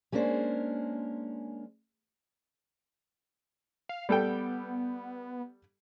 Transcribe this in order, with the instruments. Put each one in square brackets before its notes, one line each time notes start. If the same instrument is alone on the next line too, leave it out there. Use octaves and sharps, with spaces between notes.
[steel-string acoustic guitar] G#3 A#3 C#4 D4 C5
[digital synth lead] F5
[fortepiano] G3 A4 G5 [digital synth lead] B3